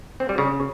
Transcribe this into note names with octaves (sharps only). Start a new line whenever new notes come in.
C4
G3
C#3